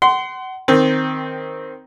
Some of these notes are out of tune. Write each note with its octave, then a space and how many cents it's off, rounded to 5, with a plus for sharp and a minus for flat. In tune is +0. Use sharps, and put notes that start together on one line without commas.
F#5 +30 C6 -15
D#3 +0 C4 +0